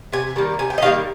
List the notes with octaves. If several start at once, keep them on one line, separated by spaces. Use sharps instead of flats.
C3 G#5
D#3 G3 A#3
C3 G#5
G5
D#5
D#3 G3 A#3 F5